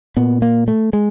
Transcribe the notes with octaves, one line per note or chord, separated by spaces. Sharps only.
A#2 B3
A#3
A3
G#3